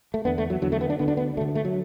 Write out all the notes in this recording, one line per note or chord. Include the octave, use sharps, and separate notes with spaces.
A3
E2 D3 B3
A3
F#3
E2 D3 F#3
A3
B3
D4
D2 D3 B3
D4
B3
D2 D3 A3
A3
F#3